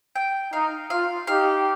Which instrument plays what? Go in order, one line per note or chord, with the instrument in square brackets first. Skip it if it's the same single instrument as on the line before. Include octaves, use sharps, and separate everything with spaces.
[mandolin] G5
[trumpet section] D#4 [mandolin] F5
[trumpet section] F4 [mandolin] F5
[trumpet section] D#4 G4 [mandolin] F5